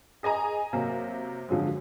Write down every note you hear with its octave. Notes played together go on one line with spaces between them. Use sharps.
G#4 D#5 G#5 A#5
C3 F#3 A#3
D3 F3 F#3 G#3